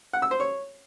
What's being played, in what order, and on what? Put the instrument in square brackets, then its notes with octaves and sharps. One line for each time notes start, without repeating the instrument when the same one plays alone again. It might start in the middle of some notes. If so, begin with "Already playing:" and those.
[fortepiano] F#5
E6
C5
C#5